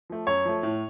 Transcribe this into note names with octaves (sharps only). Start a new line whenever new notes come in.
F3 A3
F#2 C#5
F3 A3
A2